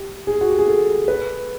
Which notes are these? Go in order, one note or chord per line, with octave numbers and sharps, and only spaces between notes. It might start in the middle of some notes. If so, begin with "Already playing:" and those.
Already playing: G4
G#4
F#4
G4
G#4
A4
B4